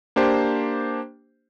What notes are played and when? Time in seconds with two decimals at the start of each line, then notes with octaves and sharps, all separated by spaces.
0.16 A#3 D4 G4 C5